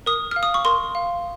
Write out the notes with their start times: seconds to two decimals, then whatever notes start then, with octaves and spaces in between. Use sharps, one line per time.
0.06 A#4 D#6
0.31 F5 F6
0.43 D#6
0.54 C#6
0.65 A#4 C6
0.95 F5